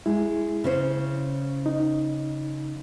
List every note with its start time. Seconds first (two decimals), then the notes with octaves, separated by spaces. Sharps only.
0.06 G#3 E4
0.64 C#3 C#4 C5
1.66 D#4